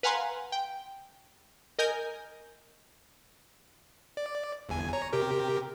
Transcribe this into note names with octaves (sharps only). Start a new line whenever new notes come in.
B4 F5 F#5 G#5 A#5 C6
G5
A#4 D#5 G#5 G6
D5
G1 E2 G#5
C#5 A#5
C3 G4 A#4